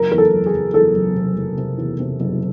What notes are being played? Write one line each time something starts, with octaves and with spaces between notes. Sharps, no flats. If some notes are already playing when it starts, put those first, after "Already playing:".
Already playing: F#1 A#4
E2 A#4
A4
F#1
G#4
F#1
E2 A4
F#1
C3
F#1
C3
E2
C3
F#1